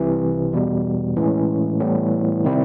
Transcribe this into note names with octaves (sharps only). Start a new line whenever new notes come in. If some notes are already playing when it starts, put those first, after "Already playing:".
Already playing: C2 C3 E3
E2 B2 G3
A2 E3 G#3 C#4
A2 E3 G3 B3
C3 D#3 G3 C4 E4